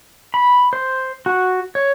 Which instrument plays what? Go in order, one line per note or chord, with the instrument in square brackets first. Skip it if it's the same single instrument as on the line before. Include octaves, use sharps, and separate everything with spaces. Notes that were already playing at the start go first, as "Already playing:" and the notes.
[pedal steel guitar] B5
C5
F#4
C#5